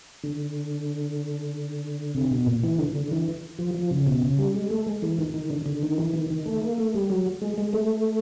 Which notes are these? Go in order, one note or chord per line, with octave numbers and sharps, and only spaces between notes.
D3
C3
B2
A#2
E3
D3
D3
E3
F3
F3
C#3
B2
C#3
G3
G#3
A3
G#3
E3
D#3
D#3
D3
D3
D#3
E3
D#3
D#3
A3
A#3
A3
G3
F#3
G#3
G#3
A3